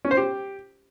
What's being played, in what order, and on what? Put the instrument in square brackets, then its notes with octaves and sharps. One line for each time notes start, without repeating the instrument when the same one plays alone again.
[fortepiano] C#4
C5
G4